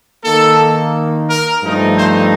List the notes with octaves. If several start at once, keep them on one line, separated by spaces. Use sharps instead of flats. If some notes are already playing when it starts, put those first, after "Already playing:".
D#3 A#3 D#4 A4
A#4
G2 F3 A3 C4 D#4
C5